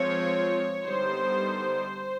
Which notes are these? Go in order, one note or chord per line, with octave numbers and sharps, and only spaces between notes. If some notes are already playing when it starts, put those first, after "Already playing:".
Already playing: F3 G#3 C4 F4 C#5
D3 G3 B3 D#4 C5